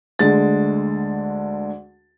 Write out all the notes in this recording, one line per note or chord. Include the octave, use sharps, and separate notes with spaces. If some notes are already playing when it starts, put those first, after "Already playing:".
D2 D3 G#3 A6